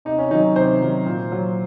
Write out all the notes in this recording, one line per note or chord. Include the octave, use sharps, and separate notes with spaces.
C3 D#4
C#4
D#3 F#3 D#4
C3 C5
D#3 F#3
A#2
F#3